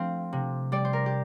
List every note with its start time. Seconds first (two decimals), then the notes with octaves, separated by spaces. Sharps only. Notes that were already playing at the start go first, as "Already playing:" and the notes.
Already playing: F3 A3 C4 F5
0.33 C3
0.72 G3 D5
0.85 C5
0.93 A#4
1.06 G4